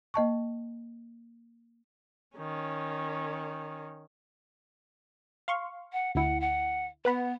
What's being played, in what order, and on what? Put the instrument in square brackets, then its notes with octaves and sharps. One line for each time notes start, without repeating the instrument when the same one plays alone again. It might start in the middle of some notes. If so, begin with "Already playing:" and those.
[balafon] A#3 D#5 A5 C#6
[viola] D#3 C#4
[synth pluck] F5 C6 C#6
[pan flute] F#5
[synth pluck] D2 E4 [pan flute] F#5
[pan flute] F#5
[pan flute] B3 [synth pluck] B4 F#5 B5